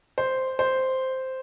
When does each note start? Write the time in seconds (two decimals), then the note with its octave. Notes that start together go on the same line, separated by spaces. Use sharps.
0.18 C5
0.59 C5